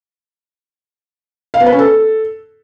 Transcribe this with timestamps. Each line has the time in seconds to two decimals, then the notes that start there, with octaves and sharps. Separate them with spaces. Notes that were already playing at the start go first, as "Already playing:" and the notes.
1.54 F5
1.60 B3
1.66 B4
1.73 C#4
1.79 A4